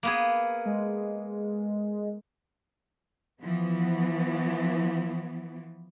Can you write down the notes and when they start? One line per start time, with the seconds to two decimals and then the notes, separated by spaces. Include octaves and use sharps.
0.03 A#3 B3 G#4
0.65 G#3
3.41 E3 F3 B3